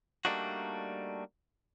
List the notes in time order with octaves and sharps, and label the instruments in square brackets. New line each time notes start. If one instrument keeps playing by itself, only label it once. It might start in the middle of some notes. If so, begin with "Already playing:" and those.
[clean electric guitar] G3 A3 A#3 D4 D#4 F#4